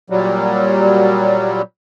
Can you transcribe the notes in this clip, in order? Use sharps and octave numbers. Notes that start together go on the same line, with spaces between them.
A#2 F#3 G3